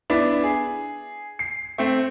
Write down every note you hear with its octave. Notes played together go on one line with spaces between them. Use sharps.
B3 D4 E4
G#4
C7
A3 C4